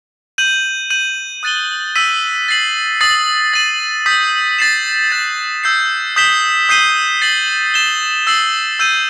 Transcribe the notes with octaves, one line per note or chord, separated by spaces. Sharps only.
G6 D#7 F#7
G6 D#7 F#7
D#6 F#6 A6 D#7 G7
E6 B6 D#7 F#7
A6 C7 F#7
D#6 A6 C7 F#7
A6 D#7 F#7
D#6 G6 B6
A6 C7 E7
F#6 A6 E7
E6 G6 C7
D#6 G6 B6 E7 G7
D#6 G6 C7 D#7 G7
A6 C7 F#7
A6 E7 G7
E6 A6 C7 F#7
E6 G6 D#7